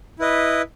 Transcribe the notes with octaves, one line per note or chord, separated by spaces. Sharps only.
E4 B4 D#5